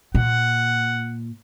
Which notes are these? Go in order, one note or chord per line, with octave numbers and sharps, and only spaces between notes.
A#2 F#5